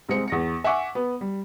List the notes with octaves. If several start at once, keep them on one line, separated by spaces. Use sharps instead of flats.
C2 G#3 C4 C#7
E2 A#6 C#7
E5 F#5 G#5 C#6 D6
B3
G3